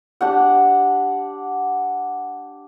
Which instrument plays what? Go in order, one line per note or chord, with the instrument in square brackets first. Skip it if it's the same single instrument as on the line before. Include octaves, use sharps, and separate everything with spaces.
[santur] D4 G4 F#5